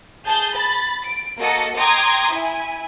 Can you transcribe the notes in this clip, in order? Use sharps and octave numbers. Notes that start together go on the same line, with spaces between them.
G#4 A5 G6
B5 A6
D7
A#3 F#4 A4 D#5 C#7
G5 A#5 C6 D6 D#6 G#6
E4 G#5